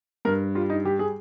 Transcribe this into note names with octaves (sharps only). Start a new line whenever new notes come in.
G2 A#4
G3 F4
D#4
G3 G4
G#4